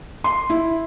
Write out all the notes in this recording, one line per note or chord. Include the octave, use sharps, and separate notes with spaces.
C6
E4